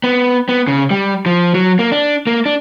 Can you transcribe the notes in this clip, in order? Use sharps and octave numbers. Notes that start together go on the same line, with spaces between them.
B3
B3
C#3
G3
F3
F#3
A#3
D4
A#3
D4